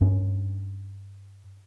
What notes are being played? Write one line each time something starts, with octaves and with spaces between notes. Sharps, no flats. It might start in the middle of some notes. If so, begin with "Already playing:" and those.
G2 C#4